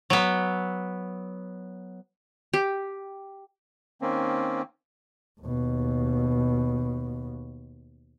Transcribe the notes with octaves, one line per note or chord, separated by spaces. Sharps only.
F#3 B3
G4
D#3 A#3 C4 C#4
D#2 B2